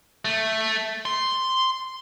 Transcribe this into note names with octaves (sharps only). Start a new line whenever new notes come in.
A3
C6